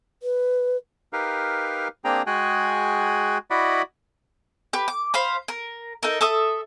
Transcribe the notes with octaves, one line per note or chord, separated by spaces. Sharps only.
B4
D#4 G4 A#4 B4 F5
A#3 C4 D4 G#4 G5 A#5
G#3 F#4 G#4 G5 G#5 F#6
E4 F#4 D5 D#5 F#5 B5
G4 B4
D6
C5 F5 B5
A#4
D#4 A4 A#4
A4 E5 D#6